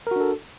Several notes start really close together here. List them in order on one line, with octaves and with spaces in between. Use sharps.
A#4 F#4 D4 A4